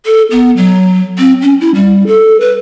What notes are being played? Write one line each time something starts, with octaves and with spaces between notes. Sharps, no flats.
A4
B3
F#3
C4
C#4
E4
G3
A4
B4